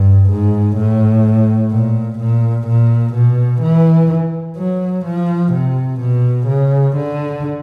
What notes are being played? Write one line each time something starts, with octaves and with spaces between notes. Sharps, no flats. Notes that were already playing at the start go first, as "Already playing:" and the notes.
Already playing: G2
G#2
A2
A#2
A#2
A#2
B2
E3
F#3
F3
C3
B2
C#3
D3